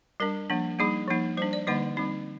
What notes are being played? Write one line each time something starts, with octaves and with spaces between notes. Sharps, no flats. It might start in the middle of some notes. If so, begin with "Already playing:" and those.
G3 D4 A#4
F3 A#3 D4
G3 A#3 D#4 G#4
F3 A#3 D#4
G3 D4 C5
D5
D3 G3 A#3 D#4 D#5
G3 C4 D#4